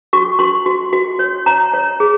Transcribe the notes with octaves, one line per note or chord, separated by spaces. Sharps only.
F#4 C#6
F#4 C6
F#4
F#4
C#5
C#5 A#5
C#5
G#4